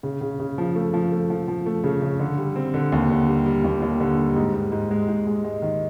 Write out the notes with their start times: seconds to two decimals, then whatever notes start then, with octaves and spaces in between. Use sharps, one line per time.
0.03 C#3
0.21 C#3
0.40 C#3
0.58 F3
0.75 A3
0.94 F3
1.12 A3
1.30 F3
1.48 F3
1.66 A3
1.84 C#3
2.02 C#3
2.19 D3
2.38 G3
2.56 C4
2.74 D3
2.92 D#2
3.10 D3
3.28 G3
3.46 G3
3.64 D#2
3.82 D#2
4.00 D3
4.18 G3
4.36 G#2
4.54 G#2
4.72 G#2
4.91 G#3
5.08 G#2
5.27 G#3
5.44 G#3
5.62 D#3